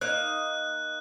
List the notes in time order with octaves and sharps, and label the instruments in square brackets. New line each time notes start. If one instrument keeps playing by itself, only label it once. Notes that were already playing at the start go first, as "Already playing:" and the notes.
[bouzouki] A#3 D#4 D#5 [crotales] F#6